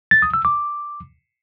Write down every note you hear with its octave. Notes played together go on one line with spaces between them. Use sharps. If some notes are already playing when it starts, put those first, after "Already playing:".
A6
D#6
E6
D6